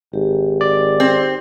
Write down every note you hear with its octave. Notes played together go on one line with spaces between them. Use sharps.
G#1 G4
D5
C4